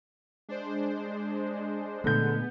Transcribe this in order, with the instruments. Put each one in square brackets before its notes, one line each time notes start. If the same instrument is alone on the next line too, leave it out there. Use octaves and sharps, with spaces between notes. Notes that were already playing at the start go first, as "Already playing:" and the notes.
[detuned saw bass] G#3 [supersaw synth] D4 C5
[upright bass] A#2 A3 [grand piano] D3 G6 [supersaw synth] B3